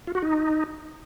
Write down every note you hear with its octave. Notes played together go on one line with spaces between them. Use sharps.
F4
F#4
D#4